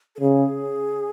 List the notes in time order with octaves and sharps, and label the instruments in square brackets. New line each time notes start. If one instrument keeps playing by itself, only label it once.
[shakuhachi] A4
[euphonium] C#3 [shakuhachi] G#4